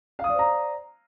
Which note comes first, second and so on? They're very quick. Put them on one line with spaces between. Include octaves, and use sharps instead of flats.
F5 D#6 D5 C5 A#5